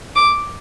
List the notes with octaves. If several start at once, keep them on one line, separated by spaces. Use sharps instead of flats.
D6